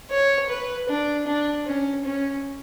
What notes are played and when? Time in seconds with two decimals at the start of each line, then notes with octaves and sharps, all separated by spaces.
0.10 C#5
0.49 B4
0.88 D4
1.27 D4
1.66 C#4
2.04 C#4